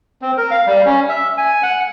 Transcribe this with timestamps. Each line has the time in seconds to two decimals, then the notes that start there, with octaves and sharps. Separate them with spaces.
0.22 C4
0.37 A#4
0.51 F5
0.67 G3
0.86 C#4
1.09 E5
1.38 G#5
1.63 F#5